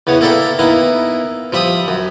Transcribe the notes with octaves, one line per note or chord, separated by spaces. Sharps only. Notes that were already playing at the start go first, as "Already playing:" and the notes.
E2 C#3 B3 C#5
A#3 E4 A4 D5 E5 G5
D#3 A#3 B3 E4
F3 G3 E5 B5 D#6
F#2